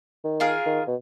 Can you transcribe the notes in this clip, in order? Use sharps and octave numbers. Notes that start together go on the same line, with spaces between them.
D#3
F4 G#4 A#4
D#3
B2